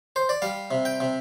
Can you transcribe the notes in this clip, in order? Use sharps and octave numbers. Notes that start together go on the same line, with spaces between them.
C5
D5
G3 F5
C3
G5
C3